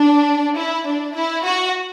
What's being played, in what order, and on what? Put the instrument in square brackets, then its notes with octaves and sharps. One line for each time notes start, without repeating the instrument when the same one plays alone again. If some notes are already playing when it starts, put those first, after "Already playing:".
Already playing: [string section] D4
E4
D4
E4
F#4